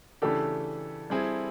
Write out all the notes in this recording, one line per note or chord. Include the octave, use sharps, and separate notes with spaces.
C#3 E3 A3 D4 G4 A4
G3 C4 E4 G#4